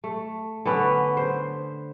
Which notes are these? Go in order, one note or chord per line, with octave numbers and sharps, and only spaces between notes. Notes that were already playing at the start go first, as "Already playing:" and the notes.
A3
D3 B3 C#4 B4
C5